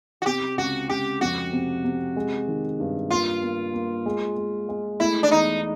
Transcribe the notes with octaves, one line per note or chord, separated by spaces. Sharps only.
F#4
C3 G4
C#2 F#4
C#2 G4
F2 F#4
C3
C3
G#3
D#3
G2
A#3 F4
A#3
A#3
G#3
G#3
G#3
A3 E4
D4
E2 D#4